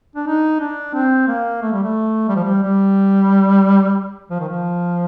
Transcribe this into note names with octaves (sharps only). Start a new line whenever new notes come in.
D4
D#4
D4
C4
A#3
A3
G3
A3
G3
F3
G3
G3
F3
D#3
F3